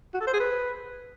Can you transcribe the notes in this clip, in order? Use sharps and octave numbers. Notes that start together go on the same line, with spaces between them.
F#4
A4
C5
G#4
B4